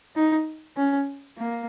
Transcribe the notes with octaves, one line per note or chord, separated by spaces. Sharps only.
D#4
C#4
A#3